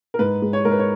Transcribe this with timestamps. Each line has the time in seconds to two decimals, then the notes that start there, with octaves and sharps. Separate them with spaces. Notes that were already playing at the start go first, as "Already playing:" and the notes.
0.14 A#4
0.19 G#2 B4
0.42 G#3
0.53 C#5
0.65 G#2 A#4
0.72 B4
0.79 C#5